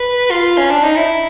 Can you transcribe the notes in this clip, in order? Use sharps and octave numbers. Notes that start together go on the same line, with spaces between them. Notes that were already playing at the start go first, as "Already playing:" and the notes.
Already playing: B4
F4
C#4
D4
D#4
E4